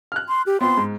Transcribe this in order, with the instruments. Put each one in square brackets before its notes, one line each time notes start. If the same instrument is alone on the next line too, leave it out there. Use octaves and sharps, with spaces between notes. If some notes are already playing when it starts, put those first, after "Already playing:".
[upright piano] F6 F#6
[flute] C6
G4
[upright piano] B3 C4 F4 [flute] C6
[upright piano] G#2